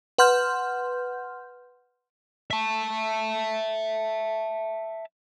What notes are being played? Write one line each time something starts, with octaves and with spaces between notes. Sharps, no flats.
B4 F#5 C6 F6 G6
E5 A5